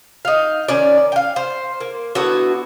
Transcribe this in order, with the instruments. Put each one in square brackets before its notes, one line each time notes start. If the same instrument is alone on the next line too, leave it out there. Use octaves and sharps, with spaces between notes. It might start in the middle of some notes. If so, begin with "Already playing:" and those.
[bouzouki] D#4 F5
D#3 C#4 D5
F5 G5
C5
A#3
D3 B3 E4 F#4